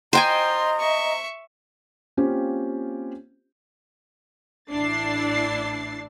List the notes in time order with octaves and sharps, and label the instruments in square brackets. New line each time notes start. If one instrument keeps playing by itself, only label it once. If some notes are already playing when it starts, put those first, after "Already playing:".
[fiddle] F4 C6 [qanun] C5 G5 G#5 [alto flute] D#5 [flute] A#5
[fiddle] E5 C#6
[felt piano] A#3 C4 C#4 F4 G4 C5
[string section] A1 D4 E4 A6 C7